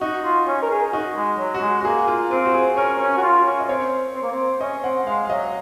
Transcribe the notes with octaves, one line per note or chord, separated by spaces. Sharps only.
D#4 F#4
F4
C#4
A#4
G#4
D#4 F#4
G#3
F#3
F#4
G#3
F#4
A#3 G#4
F4
C4 F4
F#4
G#4
C#4 A#4
C#4
F#4
F4
C#4
D#5
C4 C#5
C4
A#3
C4
C#4 D#5
C4 F#5
G#3 F5
F5
F#3 D#5